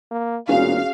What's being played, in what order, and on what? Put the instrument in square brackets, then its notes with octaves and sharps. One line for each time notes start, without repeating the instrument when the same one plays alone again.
[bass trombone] A#3
[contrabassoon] E1 [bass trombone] A#2 [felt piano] C#4 F#4 G#4 [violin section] F5